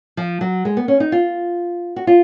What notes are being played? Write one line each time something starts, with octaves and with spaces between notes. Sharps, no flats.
F3
F#3
G#3
B3
C#4
D#4
F4
F#4
F4